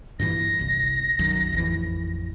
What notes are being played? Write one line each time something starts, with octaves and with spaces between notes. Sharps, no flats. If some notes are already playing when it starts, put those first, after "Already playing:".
G2 A#2 E3 A#6
G1 C2
B1 F#2 D#3
A1 F2 E3